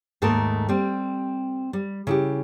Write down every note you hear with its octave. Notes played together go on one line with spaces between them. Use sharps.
D#2 G#2 A3 A#3 A#4 A5
G3 C4
G3
C#3 E4 G4